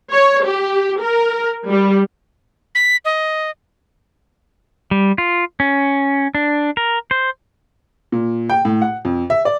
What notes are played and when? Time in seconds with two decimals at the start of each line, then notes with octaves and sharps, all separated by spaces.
0.11 C#5
0.44 G4
1.01 A#4
1.68 G3
2.75 B6
3.05 D#5
4.91 G3
5.18 F4
5.60 C#4
6.35 D4
6.77 A#4
7.11 C5
8.12 A#2
8.50 G5
8.65 A2
8.82 F#5
9.05 F2
9.30 E5
9.45 D5